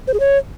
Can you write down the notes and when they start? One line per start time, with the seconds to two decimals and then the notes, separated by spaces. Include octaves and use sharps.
0.07 C5
0.14 G#4
0.20 C#5